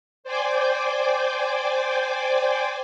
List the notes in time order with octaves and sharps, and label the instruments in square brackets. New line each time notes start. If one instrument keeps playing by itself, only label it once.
[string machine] C5 D5 G5 G#5 D6